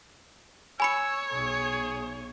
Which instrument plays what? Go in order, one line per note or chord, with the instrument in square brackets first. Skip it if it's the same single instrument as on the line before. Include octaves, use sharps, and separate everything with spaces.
[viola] C#5 [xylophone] G#5 B5 C#7 [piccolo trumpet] E6
[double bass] B1 [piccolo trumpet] G#4